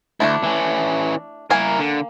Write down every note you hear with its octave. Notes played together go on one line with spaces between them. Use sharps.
D2 A3 D4 E4
E3 C#4
A#3 E4 A#4 F5 G#5
D3